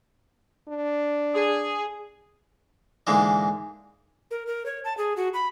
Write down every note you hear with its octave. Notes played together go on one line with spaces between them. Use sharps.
D4
G#4
G#2 D3 E3 G#3 A#3
A#4
A#4
C#5
A5
G#4
F#4
B5